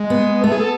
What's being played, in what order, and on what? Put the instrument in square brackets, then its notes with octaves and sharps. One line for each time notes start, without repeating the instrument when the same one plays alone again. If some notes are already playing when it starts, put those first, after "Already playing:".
Already playing: [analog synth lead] G#3
[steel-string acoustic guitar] B3
[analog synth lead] A3 [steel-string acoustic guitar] B3
[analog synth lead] G#4
A4